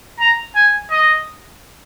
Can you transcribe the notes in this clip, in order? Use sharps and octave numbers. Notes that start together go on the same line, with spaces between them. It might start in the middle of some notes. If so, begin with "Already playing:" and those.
A#5
G#5
D#5